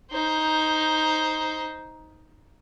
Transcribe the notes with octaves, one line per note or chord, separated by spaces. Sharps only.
D#4 C5